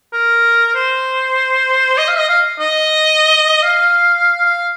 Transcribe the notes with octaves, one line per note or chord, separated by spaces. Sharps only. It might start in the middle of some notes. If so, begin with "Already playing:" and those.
A#4
C5
D#5
F5
D#5
F5
D#5
F5
F5